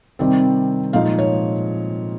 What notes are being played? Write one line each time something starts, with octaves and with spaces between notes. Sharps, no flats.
C3 D#3 G3 C4
A#2 F3 G#3 D#4 F5
C#5